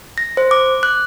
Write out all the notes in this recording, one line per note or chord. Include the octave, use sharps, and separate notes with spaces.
A#6
C5
D6
F#6